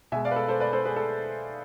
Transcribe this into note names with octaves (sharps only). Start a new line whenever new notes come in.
B2 G#3 E5 G#5
D5 F5
B4
A4
A4 C5
B4 D5
A4 C5
G#4 B4
A4